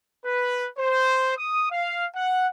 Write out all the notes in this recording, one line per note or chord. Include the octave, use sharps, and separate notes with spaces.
B4
C5
D#6
F5
F#5